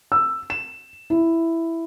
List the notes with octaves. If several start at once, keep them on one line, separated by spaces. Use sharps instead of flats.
E6
E7
E4